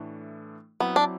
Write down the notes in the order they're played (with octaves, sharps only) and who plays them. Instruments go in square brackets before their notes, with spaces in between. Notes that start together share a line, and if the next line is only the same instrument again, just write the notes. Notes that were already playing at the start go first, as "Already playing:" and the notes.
Already playing: [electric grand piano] A2 E3 A3 D4
[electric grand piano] F#3 C4 E4 [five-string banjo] B3
[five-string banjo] D4